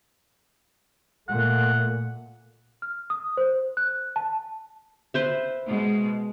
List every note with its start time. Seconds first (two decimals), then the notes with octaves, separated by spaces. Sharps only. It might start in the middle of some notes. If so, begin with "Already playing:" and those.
1.28 A#2 A3 F#5
2.82 F6
3.10 D#6
3.37 C5
3.77 F#6
4.16 A5
5.14 B4 C5 E5
5.66 B2 G#3